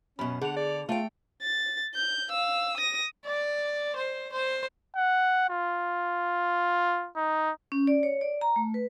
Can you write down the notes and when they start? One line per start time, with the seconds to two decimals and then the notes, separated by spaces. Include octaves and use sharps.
0.19 F#2 B2 C#4 B5
0.41 D3 G#4 F#5 F7
0.56 D5
0.89 A3 F4 G5
1.42 A6
1.95 G6
2.31 F5 E6
2.77 D#6 A#6
3.26 D5
3.96 C5
4.32 C5
4.96 F#5
5.50 F4
7.16 D#4
7.72 C#4
7.87 D5
8.03 C#5
8.21 D5
8.41 A#5
8.56 A3
8.74 B4